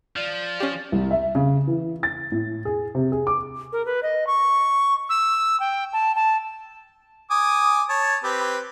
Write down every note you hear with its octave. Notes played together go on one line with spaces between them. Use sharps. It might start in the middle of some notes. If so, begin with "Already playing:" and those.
F3 D5
C#4 G4
C2
E5
C#3
E3
A6
A2
G#4
C3
G#4
D6
A#4
B4
D#5
C#6
E6
G5
A5
A5
G#5 D6 D#6
C#5 A5
C4 G4 B4